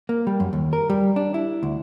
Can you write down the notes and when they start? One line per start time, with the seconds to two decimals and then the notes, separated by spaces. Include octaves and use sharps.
0.09 A#3
0.27 G3
0.40 F#2
0.53 D#2
0.73 A#4
0.90 G3
1.16 D4
1.34 E4
1.63 D2